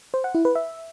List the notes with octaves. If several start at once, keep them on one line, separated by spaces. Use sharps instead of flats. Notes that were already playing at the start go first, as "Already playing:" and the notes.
C5
F#5
E4
B4
E5